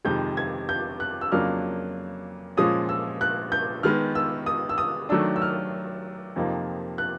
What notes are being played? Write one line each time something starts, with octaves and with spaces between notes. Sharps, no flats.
F2 C3 D#3 G#3 G6
G#6
G6
F#6
E6
F2 C#3 F#3 A#3 D4 F6
A#2 F3 G#3 C#4 D#6
E6
F#6
G6
D#3 G#3 B3 F6
E6
D#6
E6
D#6
D#3 F#3 A3 D4 E6
E6
F6
F2 C3 F3 A#3 D#4
F#6